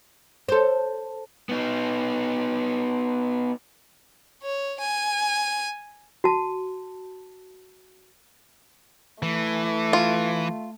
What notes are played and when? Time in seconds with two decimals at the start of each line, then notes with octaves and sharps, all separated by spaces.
0.49 A4 C5
1.49 B3 D#4
4.43 C#5
4.80 G#5
6.24 F#4 A5
9.23 E3 A3
9.93 F4